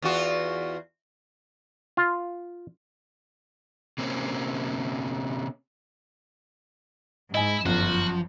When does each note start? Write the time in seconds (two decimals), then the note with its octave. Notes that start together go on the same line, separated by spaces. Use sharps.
0.02 E2 F4 F#4
1.97 F4
3.98 C3 A#3 C4 C#4
7.34 G#2 E4 D#5 G#5
7.66 G1 F#2 F3 F#4